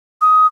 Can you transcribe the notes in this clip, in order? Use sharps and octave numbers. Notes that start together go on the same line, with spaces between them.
D#6